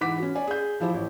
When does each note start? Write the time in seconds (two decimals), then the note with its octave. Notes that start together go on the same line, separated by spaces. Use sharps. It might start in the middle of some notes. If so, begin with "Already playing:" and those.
0.01 G#2 E3 F#5 D6 B6
0.18 C#4 F#4
0.35 C#5 D5 G#5
0.47 G#4 G6
0.80 F3 E4 G4 C5
0.94 A1